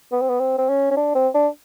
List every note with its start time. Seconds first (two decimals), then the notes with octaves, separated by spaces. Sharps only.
0.12 B3
0.21 C4
0.29 B3
0.40 C4
0.58 C4
0.69 C#4
0.91 C#4
0.97 D4
1.15 C4
1.34 D4